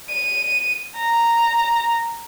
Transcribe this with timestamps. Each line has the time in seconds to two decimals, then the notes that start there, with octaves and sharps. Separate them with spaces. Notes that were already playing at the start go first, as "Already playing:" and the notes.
0.10 D#7
0.97 A#5